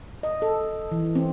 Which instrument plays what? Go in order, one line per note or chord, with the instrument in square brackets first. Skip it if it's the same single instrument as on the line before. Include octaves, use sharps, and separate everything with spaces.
[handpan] D#5
A4
E3
C4